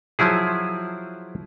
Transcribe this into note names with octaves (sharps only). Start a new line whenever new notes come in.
F3 F#3 E4 G#4